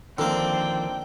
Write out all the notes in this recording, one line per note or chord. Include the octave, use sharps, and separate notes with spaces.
D3 D#3 F3 A#3 C4 D4 A#4 G5